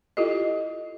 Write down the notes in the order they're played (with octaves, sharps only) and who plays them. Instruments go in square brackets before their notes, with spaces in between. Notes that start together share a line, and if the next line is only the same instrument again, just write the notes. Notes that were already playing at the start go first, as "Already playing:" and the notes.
[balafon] E4 F4 G4 A4 D#5